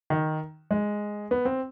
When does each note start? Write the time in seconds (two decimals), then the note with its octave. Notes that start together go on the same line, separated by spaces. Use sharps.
0.10 D#3
0.71 G#3
1.31 B3
1.45 C4